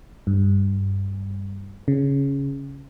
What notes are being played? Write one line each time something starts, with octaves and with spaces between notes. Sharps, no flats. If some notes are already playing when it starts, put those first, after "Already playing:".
G2
C#3